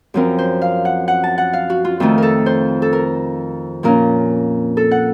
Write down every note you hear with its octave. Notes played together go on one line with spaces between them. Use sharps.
F#2 F3 C4 A#4
C5
F5
F#5
F#5
A5
F#5
F5
F#4
F4
F2 D#3 A3 F4
A4 A#4
C5
A4
A#4
A#2 F3 A#3 C#4 A#4
A4
F#5